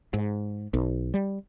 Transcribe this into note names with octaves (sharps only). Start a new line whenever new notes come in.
G#2
B1
G3